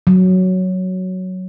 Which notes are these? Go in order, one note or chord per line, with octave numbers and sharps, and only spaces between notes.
F#3